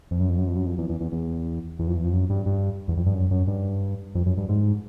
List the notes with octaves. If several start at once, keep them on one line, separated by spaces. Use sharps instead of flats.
F2
F#2
F2
F#2
F2
F#2
F2
E2
E2
E2
E2
E2
F2
E2
F2
F#2
G2
G2
E2
F2
G2
F#2
F#2
G2
F2
F#2
G2
G#2